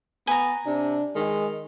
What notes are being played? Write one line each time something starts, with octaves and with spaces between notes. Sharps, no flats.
B3 G#5 A#5
C3 D4
D#3 G#3